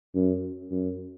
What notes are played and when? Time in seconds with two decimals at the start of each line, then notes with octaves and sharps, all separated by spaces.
0.15 F#2
0.71 F#2